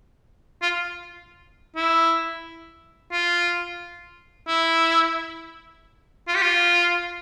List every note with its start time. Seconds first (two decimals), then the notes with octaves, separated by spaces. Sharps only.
0.62 F4
1.76 E4
3.12 F4
4.48 E4
6.28 F4
6.35 G4
6.42 F4